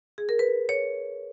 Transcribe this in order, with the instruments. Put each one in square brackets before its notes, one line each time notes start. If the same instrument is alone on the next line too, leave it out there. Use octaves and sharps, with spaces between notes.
[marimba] G#4
A#4
B4
C#5